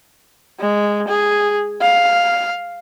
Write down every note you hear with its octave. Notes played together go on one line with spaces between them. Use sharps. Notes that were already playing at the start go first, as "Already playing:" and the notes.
G#3
G#4
F5